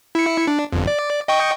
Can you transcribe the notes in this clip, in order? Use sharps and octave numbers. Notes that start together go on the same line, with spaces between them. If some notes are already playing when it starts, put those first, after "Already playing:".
E4 C#7
D4
G1 F2
D5
D#5 G5 C#6